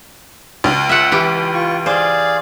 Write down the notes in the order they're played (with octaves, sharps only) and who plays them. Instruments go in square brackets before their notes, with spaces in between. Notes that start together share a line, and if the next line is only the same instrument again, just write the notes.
[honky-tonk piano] C#2
[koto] E5 F#5
E3 G4
[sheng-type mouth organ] F4 C#6
[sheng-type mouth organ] G#4 D5 F5 [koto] C5